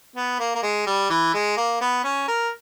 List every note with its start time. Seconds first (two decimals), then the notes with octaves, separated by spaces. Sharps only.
0.16 B3
0.39 A#3
0.55 A#3
0.62 G#3
0.87 G3
1.10 E3
1.34 G#3
1.57 A#3
1.81 B3
2.04 C#4
2.28 A#4